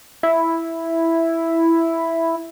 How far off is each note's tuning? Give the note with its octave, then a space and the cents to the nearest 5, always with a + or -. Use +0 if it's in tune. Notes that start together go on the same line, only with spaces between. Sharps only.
E4 +0